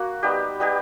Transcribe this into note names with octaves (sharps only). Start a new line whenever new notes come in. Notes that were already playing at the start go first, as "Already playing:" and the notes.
Already playing: A#3 F#4
G3 B3 D#4 G4
G3 B3 D#4 G4